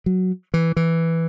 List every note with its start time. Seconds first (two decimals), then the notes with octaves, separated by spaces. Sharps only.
0.06 F#3
0.54 E3
0.76 E3